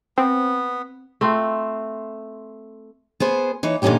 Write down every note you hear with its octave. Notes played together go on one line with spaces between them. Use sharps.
B3 C4
A3 C4 F4
B3 G#4 C5
E3 D#4 C#5
A#2 D3 E3 C#4 D#4 G4